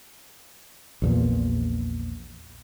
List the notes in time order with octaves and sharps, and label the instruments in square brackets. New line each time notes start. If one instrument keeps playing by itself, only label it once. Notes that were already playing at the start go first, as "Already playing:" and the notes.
[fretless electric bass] A#1 E2 A#2